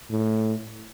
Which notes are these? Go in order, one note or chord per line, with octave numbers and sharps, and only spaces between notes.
A2